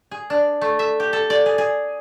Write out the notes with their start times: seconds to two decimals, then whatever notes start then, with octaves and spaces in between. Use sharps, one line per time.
0.11 G#4
0.30 D4
0.61 A3
0.79 E5
1.00 G4
1.13 A4
1.30 D5
1.46 G#4
1.58 G#4